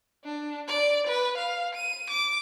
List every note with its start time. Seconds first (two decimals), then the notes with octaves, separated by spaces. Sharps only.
0.25 D4
0.68 D5
1.07 B4
1.37 F5
1.75 D#7
2.10 D6